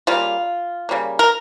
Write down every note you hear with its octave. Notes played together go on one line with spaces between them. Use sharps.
C#3 G3 A#3 F4
C#3 G3 A#3
A#4